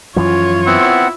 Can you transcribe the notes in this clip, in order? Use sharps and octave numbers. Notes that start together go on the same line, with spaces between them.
F#2 E3 F3 F4 C#5
B3 C4 E4 F#5